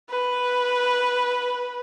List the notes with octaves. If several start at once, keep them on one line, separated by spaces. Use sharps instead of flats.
B4